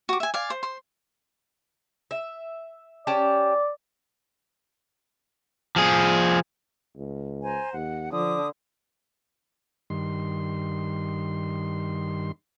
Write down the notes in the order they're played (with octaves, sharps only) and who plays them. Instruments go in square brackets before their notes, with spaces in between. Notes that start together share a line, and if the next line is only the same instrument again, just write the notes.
[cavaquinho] F#4 D6
E5 G#5
D5 F5 G#5
C5
C5 C6
[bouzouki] E5
[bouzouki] C#4 G4 A5 [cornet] D5
[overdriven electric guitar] F3 G#4
[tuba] C#2
[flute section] C5 G#5 A#5
[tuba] D#2 [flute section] F#5
[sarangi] D3 [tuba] F3 [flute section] D6 D#6
[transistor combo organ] G2 D#3 C6